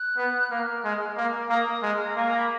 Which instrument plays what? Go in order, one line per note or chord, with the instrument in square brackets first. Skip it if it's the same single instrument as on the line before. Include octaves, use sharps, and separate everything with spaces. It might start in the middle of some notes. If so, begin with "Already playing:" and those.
Already playing: [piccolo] F#6
[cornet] B3
[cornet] A#3 [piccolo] F6
[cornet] G#3
[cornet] A#3 [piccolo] F6
[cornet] A#3 [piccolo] D#6
[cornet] G#3 [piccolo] F6
[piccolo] F6
A#5
[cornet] A#3 [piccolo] G#5
[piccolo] A#5
B5